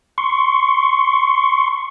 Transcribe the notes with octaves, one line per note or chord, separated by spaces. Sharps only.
C6 C#6